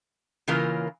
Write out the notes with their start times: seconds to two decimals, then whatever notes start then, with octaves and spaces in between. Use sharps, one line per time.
0.48 C#3 E3 A#3 F4 A#4